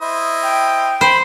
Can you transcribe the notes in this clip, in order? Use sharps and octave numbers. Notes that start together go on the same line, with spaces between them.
E4 C5 D#5
G5
C5 B5